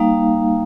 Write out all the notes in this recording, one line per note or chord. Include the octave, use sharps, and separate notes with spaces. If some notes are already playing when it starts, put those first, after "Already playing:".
Already playing: G3 A#3 D#4 F5